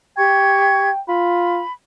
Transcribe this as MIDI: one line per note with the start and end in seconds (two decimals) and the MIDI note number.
0.18 0.89 67
0.18 1.00 79
0.18 0.89 85
0.18 0.89 92
1.09 1.63 65
1.09 1.70 83